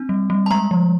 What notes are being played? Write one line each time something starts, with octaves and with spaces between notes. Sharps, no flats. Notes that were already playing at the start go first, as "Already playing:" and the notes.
Already playing: C4 D4
G3
G3
A5
G#3 A#5
F3